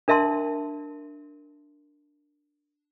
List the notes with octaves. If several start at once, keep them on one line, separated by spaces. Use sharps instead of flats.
D4 A#4 E5 A5 C6